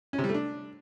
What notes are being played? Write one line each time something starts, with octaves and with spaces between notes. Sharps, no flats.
C#4
C3
G3
A3
D4